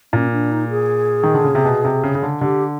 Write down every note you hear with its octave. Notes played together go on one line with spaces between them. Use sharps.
A#2 C#4
D4
D#4
G#4
D#3
D3
C#3
C3
B2
C3
C#3
C#3
D3
D3 G4